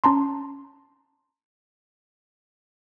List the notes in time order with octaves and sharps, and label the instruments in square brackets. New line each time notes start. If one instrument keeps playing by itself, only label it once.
[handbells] C#4 A5 A#5 C6